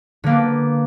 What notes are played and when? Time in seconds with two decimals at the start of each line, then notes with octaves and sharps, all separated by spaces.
0.24 D3
0.26 A#3
0.29 B3